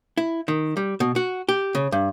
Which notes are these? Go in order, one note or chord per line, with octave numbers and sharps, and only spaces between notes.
E4
D#3
G3
B2
F#4
G4
C#3
G2